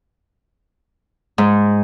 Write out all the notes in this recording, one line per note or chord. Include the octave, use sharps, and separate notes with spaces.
G#2